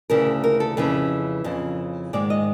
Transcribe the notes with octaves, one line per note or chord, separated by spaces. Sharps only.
D2 C#3 E3 A#4
A#4
A4
F2 C#3 E3 B4
F2 C#3 E3
G#2 D#3 G#3 D5
D#5